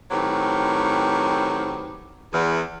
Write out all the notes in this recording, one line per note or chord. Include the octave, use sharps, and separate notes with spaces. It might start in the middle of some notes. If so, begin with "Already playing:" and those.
A2 D#3 F#3 C4 G4 B4
E2